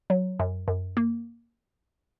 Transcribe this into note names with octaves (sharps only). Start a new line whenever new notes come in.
F#3
F#2
F#2
A#3